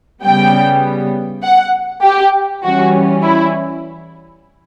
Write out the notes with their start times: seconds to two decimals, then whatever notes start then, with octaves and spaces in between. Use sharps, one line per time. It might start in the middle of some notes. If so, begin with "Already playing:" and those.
0.24 C#3 G3 B3 G5
1.43 F#5
2.03 G4
2.63 E3 G3 C#4 F#4
3.23 E4